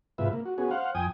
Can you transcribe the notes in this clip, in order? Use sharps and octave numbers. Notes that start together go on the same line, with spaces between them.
G#2 C3 F4 B4 E5
A#3
F#4
B3 C#4 F#4 G#4
C5 F5 F#5
F2 G5 G#5 D#6